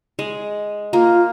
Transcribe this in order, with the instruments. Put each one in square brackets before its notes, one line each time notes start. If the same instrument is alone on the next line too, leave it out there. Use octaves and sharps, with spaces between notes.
[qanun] G#3
[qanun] A#3 [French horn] F4